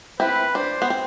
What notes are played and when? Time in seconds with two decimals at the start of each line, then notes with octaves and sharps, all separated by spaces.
0.20 C4 E4 B4
0.55 D4 C5
0.82 B3
0.90 C4